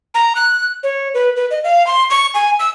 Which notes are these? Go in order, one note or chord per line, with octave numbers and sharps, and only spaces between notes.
A#5
F#6
C#5
B4
B4
D#5
F5
C6
C#6
G#5
E6